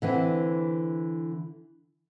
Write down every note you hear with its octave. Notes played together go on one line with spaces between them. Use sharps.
D3 E3 C4